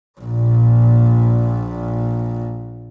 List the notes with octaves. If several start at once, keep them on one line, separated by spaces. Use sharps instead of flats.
A#1 A#2